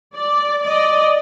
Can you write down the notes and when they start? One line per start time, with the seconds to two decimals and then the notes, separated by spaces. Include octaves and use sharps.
0.15 D5
0.63 D5 D#5